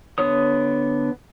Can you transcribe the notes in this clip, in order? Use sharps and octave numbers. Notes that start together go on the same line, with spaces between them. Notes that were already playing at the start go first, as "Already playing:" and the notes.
D3 B3 C#5 D#6